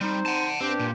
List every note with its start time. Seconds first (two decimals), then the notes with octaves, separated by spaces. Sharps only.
0.01 G3 C4 D#4 C5
0.26 F#5 A5
0.61 G2 C4 D4 G4
0.79 A#2